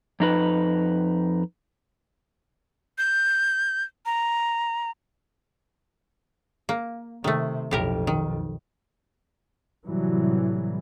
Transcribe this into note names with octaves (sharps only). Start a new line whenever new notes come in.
F2 D#4 B4
G6
A#5
A#3
C3 D#3 A3
B1 F2 A2 G4 A#4
D#3
A2 C3 E3 F#3 G3